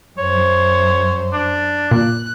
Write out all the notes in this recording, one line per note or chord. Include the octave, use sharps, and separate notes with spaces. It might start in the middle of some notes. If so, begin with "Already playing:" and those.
F#2 C5 C#5
D4
A#2 F#6